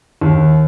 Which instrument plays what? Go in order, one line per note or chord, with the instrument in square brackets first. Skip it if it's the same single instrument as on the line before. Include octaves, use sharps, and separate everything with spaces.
[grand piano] D#2